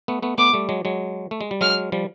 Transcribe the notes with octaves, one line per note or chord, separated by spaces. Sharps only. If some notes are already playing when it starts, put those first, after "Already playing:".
A3 B3
A3 B3
A3 B3 D6
G3 A3
F#3 G#3
F#3 G#3
A3
G#3
G3
F#3 G#3 F6
F3 G3